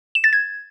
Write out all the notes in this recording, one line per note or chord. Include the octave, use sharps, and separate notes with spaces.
E7
A6
G#6